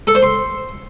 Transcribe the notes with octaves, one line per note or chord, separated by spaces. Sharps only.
A4
C5
C6